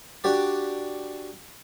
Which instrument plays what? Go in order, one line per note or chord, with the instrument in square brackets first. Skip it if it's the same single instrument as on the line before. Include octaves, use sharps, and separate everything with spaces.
[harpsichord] D4 F#4 G4 D5